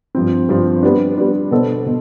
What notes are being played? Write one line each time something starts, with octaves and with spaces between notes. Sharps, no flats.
G2 F3 C4
G2 F3 C4
G3 B3 D4
G3 B3 D4
B2 B3 D4 A4 C5
B2